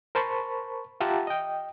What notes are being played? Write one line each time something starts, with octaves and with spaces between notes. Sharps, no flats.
A#4 C5 A5 B5 C#6
F4 G4 E5 F#5 A5 A#5
D#5 G5